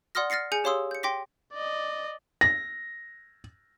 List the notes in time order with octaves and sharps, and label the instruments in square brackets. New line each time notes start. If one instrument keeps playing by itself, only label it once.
[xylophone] D5 F#5 C6 D#6 F6 A#6
F6 A6 A#6 C7 C#7
G#4 G#5 G6 C#7
G4 C#5 F5 C6 D#6 E6
G6 C#7
G5 C6 D6 A#6 B6
[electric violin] D5 D#5
[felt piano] A#6